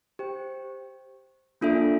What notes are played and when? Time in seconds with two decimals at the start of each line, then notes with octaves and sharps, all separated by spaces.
0.19 G4 C5 G5
1.61 A#3 D4 F4 A4 E5